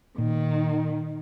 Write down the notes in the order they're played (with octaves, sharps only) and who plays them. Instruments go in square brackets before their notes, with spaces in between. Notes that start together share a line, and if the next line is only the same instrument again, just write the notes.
[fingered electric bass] A#2 [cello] D#3